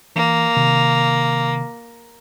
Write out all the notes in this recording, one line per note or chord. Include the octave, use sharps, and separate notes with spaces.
E3 A#3
C3 D#3